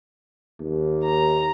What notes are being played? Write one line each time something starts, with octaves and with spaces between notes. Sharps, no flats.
D#2
A#5